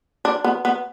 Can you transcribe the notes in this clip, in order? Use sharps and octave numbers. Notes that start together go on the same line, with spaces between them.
D4
B3
B3